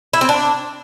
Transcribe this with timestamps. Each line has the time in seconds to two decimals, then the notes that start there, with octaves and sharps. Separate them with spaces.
0.13 E4
0.21 C4
0.29 D4